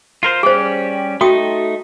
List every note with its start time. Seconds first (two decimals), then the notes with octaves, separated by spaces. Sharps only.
0.23 F4 A#4 C5
0.43 G3 C#4 G4 G#4 C5
1.21 A3 D#4 F#4 G5 D#6